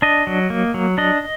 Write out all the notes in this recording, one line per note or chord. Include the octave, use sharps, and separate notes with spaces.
D4 D#5
F#3
A#3
F#3
D4 D#5